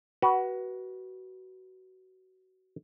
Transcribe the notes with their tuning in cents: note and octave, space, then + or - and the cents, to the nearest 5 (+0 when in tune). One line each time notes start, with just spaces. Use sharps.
F#4 +20 B4 -15